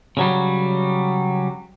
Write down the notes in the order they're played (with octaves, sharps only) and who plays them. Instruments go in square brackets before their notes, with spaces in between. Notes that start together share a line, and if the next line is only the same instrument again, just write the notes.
[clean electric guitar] C#3 F#3 G3